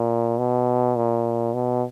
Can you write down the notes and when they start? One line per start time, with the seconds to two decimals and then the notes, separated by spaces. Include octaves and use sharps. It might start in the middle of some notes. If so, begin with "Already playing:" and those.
Already playing: A#2
0.38 B2
0.96 A#2
1.54 B2